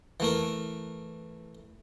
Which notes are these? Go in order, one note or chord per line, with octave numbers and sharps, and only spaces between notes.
E3 A3 A#4